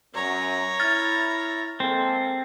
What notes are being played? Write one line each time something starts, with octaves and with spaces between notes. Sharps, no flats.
F#2 C#5 A#5
E4 F6 A6
G#3 A#3 C4 A4